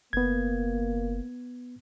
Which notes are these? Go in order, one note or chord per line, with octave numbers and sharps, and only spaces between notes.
F#1 A#3 B3 G#6